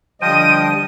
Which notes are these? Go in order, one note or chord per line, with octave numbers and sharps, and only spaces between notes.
D3 F3 G3 D#5 G5 D#7